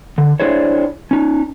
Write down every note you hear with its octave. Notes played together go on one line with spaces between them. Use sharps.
D3
D4 E4 G#4 C5 C#5
C#4 D#4